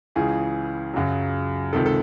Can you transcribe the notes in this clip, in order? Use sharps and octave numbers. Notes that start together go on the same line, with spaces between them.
C#2 C#3 E3 G#4
F#2 C#3 F#3
C#2 C3 D#3 A4
A4